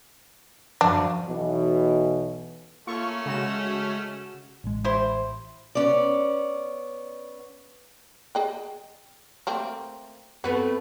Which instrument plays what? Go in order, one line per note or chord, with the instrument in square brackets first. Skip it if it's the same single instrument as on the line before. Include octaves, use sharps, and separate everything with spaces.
[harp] F#2 F3 [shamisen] D4
[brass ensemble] B1 B2 E3
[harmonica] A3 C#4 [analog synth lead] A#3 [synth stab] F4 A4 C#6
[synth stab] C#3 F#4 E7 [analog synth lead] G#3
[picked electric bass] A1 G#3
[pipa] E4 G4 C5
[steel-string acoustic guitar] B3 C#4 D5
[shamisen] G#4 D#5 G5
A3 A#3 C4
[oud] A3 B3 C4 [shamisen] F#4